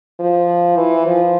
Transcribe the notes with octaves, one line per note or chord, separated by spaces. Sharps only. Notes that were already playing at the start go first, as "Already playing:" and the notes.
F3
E3
F3